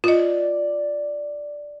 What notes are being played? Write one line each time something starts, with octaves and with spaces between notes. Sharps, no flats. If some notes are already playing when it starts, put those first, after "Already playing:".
F4 D5 D#5